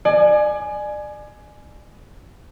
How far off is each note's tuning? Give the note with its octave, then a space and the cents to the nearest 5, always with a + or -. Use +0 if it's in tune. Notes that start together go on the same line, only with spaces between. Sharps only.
D5 +35 G#5 +15